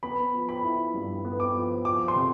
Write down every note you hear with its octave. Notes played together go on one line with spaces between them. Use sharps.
B3 B5
F3
B5
E4
G2
B3
D6
F3
F3 D6
C6
C3